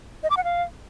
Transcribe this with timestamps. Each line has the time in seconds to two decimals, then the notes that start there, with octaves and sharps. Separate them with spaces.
0.23 D#5
0.30 D6
0.37 F#5
0.44 F5